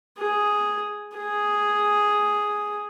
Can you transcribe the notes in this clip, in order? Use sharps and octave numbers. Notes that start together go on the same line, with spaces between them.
G#4
G#4